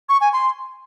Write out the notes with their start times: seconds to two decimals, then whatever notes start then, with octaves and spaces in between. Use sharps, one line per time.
0.09 C#6
0.21 G#5
0.33 C6